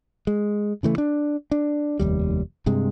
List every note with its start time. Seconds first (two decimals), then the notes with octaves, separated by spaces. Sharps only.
0.27 G#3
0.83 C#3 E3 A3
0.98 D4
1.51 D4
1.99 F1 D#2 G3
2.66 G2 C3 G#3